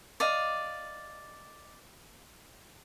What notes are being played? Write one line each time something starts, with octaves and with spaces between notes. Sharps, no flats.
D5 D#5 F5